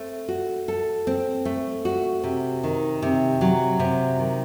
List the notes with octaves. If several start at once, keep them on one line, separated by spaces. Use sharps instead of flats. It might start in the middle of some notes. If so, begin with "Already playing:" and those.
Already playing: A3 C4
F#4
A4
C4
A3
F#4
C3
D#3
C3
F#3
C3
D#3